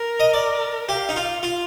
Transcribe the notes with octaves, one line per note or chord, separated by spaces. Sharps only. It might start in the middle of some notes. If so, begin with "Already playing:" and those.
Already playing: A#4
D#5
D5
G4 F5
D#4
F4
F4